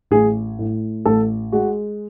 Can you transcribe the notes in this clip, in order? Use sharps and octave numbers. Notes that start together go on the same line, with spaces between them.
A1 G#4
A2
A1 A4
G#3 F#4